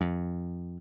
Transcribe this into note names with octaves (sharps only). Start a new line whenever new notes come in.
F2